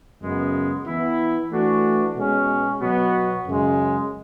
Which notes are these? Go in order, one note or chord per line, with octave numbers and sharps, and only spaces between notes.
F#2 C#3 G#3 B3
E3 B3 E4
E3 A3 D4 F#4
B2 G#3 C#4
B2 F#3 B3 F#4
F#2 C#3 G#3